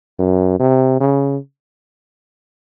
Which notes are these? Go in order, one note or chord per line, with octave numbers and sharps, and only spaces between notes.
F#2
C3
C#3